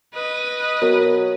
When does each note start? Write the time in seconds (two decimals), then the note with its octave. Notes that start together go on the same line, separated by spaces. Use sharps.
0.14 B4 D#5
0.82 B2 F#3 A#4